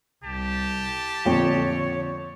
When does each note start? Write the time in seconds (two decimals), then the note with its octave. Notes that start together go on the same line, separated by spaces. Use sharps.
0.24 C2 G4 A5
1.25 F2 A#2 D3 C#5 G5